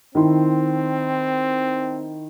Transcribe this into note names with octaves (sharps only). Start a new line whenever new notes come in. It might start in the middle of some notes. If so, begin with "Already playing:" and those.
D#3 C4 E4 C6